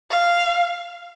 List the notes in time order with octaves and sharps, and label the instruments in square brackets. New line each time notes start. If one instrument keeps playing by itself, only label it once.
[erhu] F5